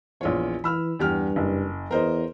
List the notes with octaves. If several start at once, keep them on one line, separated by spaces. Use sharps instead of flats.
A#1 E2 F4 C#5
E3 B5 E6 F6
E2 G2 G4 F6
F#1
E2 A#4 C5 D#5